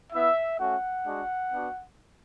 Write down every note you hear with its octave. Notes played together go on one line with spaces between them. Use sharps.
B3 E4 E5
A3 C#4 F#4 F#5
G#3 D4 F#4
B3 D4 F#4